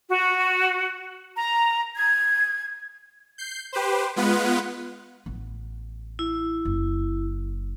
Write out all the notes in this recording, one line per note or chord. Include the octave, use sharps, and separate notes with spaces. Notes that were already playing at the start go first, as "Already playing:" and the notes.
F#4
A#5
G#6
G6 C7
G4 B4 C5
G#3 B3 F4 B4 F#5
A1 B3
E4
F#1